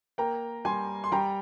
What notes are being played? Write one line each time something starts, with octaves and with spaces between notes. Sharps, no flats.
A#3 G5 A#5
G3 G#5 C6
C6
G3 G5 A#5